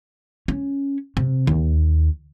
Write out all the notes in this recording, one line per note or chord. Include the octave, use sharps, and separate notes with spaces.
C#4
C3
D#2